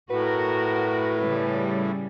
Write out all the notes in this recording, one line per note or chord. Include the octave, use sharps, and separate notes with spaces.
A2 F#4 A#4 B4
C#3 G3